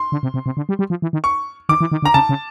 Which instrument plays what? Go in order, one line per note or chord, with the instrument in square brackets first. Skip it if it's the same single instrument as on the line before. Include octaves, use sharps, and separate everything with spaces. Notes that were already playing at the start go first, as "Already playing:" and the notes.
Already playing: [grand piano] C6
[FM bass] D3
C3
C3
C3
D3
G3
G3
F3
E3
D#3
[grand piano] C#6
[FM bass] D#3 [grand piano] D6
[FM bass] E3
D#3
D3
[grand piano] A#5
[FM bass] C#3 [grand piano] A5
[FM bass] C#3